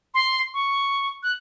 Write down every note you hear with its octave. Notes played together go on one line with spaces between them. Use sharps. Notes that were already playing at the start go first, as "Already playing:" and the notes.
C6
C#6
F#6